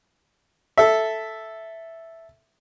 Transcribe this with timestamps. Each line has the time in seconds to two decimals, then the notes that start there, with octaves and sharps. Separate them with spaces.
0.78 A4 E5